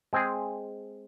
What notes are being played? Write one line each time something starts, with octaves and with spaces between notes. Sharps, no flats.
G#3 C4 G#4